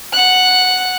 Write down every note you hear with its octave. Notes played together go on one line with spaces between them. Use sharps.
F#5 F#6